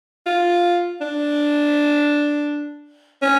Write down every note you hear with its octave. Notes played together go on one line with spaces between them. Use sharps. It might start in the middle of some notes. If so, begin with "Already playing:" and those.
F4
D4
C#4